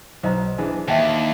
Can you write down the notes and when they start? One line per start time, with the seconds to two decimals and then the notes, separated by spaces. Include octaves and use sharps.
0.23 B1 C5 D#5 A#5
0.58 E3 D4 G#4
0.88 D#2 E5 G5 A5